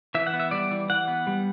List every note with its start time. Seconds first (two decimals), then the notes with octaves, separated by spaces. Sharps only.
0.15 E3 E5
0.27 F#5
0.34 B3
0.40 E5
0.51 G3 D5
0.71 E3
0.89 E3 F#5
1.08 B3
1.27 G3